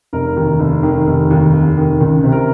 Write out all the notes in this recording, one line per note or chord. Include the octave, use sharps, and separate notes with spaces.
F1 A#4
D#2
F1
D#3
F1
D#2
F1
D#3
C#2
C3
A#4